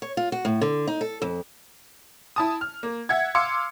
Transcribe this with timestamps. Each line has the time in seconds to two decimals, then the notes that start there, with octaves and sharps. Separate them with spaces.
0.02 C#5
0.17 F4
0.32 F#4
0.45 A2
0.61 D3
0.87 D#4
1.01 A4
1.22 F2
2.36 E4 A5 D#6
2.61 F6
2.83 A#3
3.09 E5 F#5 G#6
3.35 F5 C6 D6 E6 C#7